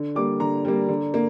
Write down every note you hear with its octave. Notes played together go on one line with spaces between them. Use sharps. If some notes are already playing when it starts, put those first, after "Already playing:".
Already playing: D3
G3 A#3 D6
D3 A#5
G3 A#3
D3
A#3